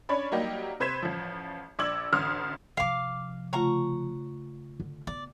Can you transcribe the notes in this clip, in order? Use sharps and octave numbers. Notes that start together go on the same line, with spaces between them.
C#4 D4 C#5 D5 B5
F#3 G3 A#3 D#4 G4
C3 B4 C5 G#6 B6 E7
A1 F3
A#1 D5 D6 E6 G#6 F#7
A1 D2 C6 D#6 F6
C3 F3 F5 D6
C#3 A3 F4 F#5 A#5 C#6
D3
B3 D5